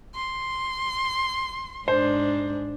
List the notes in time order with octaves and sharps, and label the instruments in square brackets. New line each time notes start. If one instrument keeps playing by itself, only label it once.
[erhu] C6
[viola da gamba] G#2 D4 [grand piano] C5